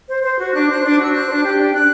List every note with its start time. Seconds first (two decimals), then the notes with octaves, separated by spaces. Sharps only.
0.08 C5
0.23 C5
0.38 F#4
0.53 D4 F#6
0.68 C5
0.83 D4
0.98 F#4 E6
1.13 C5 F#6
1.28 D4
1.43 G4
1.58 D4
1.73 D4 F#6